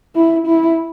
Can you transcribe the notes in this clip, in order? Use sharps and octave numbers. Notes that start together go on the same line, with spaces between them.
E4
E4